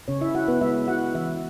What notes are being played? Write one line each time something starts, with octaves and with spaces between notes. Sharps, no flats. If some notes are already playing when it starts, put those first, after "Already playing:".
C#3 C#4 C#5
E4 E5
E4 F#4 F#5
B3 B4
G#3 E4 E5
E4 F#4 F#5
E3 E4 E5